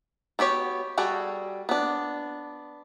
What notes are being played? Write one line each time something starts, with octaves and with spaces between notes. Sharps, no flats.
B3 F#4 G4 C#5
G3 F#4 G#4 A4
B3 D4